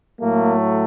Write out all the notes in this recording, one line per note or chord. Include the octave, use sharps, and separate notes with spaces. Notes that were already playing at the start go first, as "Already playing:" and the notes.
A2 F#3 A3 A#3